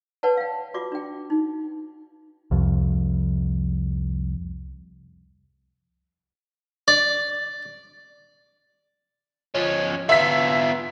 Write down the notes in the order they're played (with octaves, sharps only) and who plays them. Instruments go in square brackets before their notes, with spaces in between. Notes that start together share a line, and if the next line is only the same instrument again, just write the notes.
[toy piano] B4 C#5 D5 F#5 A5
F5 G5
F4 F#4 D5 D6
D4 G5
D#4
[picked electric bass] C2 F2
[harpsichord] D5
[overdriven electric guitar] F3 C#4
[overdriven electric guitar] B3 F4 [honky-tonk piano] E5 B6